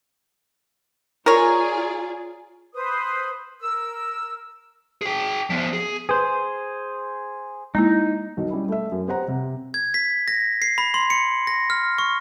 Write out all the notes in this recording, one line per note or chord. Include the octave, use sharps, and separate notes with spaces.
F4 G#4 A#4 C#5 D5
B4 C5 D#6
A#4 E6
G#4 G5
F3 B3
G#4
G#4 B4 C5
G#3 A#3 D#4 E4
B1 D#3
G3 C#4 E4
A3 E5
F#2
B3 G4 C5 F#5 A#5
C3
G#6
B6
A#6
C7
B5
C6
C#7
A#6
F6
C#6